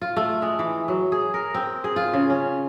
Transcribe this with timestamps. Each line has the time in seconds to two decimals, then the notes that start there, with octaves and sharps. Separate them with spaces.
0.01 F4
0.16 A3
0.42 G#3
0.59 E3
0.88 F#3
1.12 G#4
1.34 A#4
1.54 C4
1.84 G#4
1.96 F4
2.13 C#3
2.30 C#4